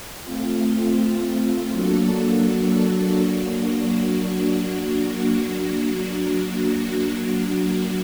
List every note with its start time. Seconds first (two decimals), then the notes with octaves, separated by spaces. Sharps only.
0.23 A3 C4 F4
1.72 F#3 A#3 D4 F#4 A4
3.21 F#3 A#3 D4 F#4